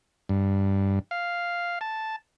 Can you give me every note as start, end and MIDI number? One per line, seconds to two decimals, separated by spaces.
0.29 0.99 43
1.11 1.79 77
1.81 2.16 81